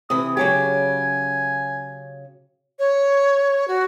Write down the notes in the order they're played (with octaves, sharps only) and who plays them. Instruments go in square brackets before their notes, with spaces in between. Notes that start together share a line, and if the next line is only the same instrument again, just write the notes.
[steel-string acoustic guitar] C3 E3 [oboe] D#6
[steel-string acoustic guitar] C#3 F#3 G4 [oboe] G#5
[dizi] C#5
F#4